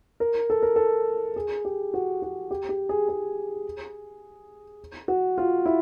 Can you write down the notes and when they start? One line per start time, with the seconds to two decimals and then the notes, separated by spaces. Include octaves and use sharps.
0.20 A#4
0.50 A4
0.62 A#4
0.76 A4
1.36 G#4
1.65 G4
1.94 F#4
2.22 F#4
2.51 G4
2.69 G4
2.89 G#4
3.08 G#4
5.08 F#4
5.38 F4
5.65 E4